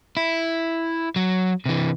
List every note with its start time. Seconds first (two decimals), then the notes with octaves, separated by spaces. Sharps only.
0.17 E4
1.16 F#3
1.66 C3 E3